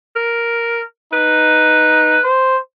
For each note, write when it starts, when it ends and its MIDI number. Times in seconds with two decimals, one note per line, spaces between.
0.16 0.82 70
1.13 2.18 63
1.13 2.23 71
2.24 2.59 72